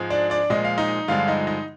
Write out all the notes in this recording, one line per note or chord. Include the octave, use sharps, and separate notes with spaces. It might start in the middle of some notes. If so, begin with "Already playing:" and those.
Already playing: G#2 F3 G#3
D4 D5
D4 D5
A#2 F3 G#3 D#5
F5
D#4 D#5
G2 D3 F3 G#3 F4 F5
D#4 D#5
D#4 D#5